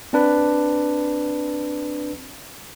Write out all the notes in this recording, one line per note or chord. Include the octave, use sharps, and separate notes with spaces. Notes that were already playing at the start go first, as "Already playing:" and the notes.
C4 D4 B4